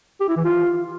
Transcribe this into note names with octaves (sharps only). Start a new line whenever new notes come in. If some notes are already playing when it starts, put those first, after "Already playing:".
G4
E4
E3
F4